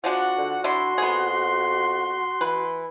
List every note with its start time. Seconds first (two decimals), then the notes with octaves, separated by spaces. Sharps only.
0.04 F3 G#3 D4 F#4 F#5
0.38 D3
0.64 D3 D4 E4 C6
0.98 F2 B3 G#4
2.41 E3 B4